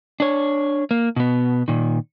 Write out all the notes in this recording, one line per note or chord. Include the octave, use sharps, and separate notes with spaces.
D4 C#5
A#3
B2 B3
A#2 D#3